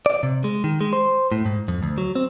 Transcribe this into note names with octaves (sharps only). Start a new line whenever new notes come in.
D5
C3
G#3
D#3
G#3
C5
A2
G#2
F2
D2
F#3
C4